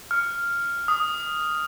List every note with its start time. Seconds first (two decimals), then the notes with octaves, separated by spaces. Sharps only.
0.11 F6
0.88 D#6